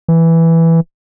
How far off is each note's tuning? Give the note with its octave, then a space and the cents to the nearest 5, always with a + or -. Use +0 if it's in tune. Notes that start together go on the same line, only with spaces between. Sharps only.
E3 +0